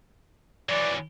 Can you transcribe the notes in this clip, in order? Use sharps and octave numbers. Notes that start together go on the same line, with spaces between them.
E3 F#3 D5